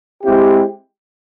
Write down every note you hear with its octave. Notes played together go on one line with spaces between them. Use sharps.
G#3 C4 E4 G4